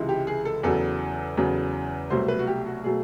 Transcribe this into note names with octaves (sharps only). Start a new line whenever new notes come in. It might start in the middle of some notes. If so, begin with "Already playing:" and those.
Already playing: C#2 C3 E3 G#3
G4
G#4
A4
E2 C#3 F#3 A4
E2 C#3 F#3
C2 B2 F#3 A3 C5
B4
F#4
G4
F#4
B2 F#3 A3 G#4